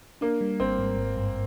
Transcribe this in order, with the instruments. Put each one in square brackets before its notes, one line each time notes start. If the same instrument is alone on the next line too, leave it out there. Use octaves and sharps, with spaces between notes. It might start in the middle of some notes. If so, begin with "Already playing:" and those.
[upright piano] A#3 [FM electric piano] D4
[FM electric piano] G3
[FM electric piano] G#1 [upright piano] C4
[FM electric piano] G#2
G#1
G2